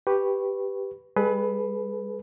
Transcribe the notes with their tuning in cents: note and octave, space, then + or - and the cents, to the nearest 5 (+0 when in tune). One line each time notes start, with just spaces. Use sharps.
G4 +0 B4 +0 C#6 +0
G3 +45 G#4 +45 B4 +0